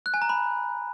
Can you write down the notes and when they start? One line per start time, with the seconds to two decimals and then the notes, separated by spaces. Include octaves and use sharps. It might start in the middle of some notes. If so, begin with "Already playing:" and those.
0.06 F#6
0.14 G#5
0.22 A#5
0.29 B5